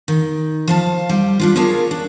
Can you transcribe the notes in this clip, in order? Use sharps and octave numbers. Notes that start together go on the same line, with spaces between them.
D#3
F3 F5 A5
G3
G3 D4 F4
A#3 F4 G#4 A#4 C#5 A5
D4